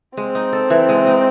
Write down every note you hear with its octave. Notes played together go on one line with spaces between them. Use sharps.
G#3 C4
D#4
A4
E3
G#3
D#4